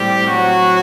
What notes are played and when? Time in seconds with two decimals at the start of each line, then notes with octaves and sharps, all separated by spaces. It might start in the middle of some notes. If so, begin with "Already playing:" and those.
Already playing: A2 G3 C4 G4
0.27 F#3 F#4